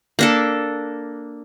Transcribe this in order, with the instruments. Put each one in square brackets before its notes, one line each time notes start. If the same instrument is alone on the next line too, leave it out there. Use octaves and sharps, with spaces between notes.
[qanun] A#3 D4 A4